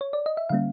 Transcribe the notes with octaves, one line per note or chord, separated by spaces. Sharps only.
C#5
D5
D#5
E5
D3 G3 A#3 C#4 F5